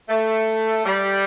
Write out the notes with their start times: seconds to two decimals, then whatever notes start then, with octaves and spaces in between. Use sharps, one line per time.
0.09 A3
0.84 G3